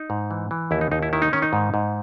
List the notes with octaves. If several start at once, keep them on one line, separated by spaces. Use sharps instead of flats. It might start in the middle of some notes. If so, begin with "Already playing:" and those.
Already playing: D#4
G#2
E3
E3
D#2 E4
D#4
D#2 D#4
E4
D#3 E4
D#4
D#3 C#4
D#4
G#2
G#2